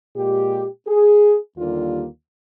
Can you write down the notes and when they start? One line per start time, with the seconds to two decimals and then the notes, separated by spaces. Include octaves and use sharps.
0.16 A#2 G#3 G4
0.87 G#4
1.57 D#2 D3 G3 A#3 F4